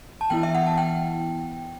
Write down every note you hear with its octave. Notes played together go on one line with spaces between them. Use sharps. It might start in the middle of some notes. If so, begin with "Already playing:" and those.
A5
E3 B3 E4 G5
E5
F#5
A5
G5